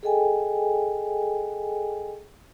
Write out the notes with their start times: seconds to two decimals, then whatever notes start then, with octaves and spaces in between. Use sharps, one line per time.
0.03 G#4 A4 D#5 G5 G#5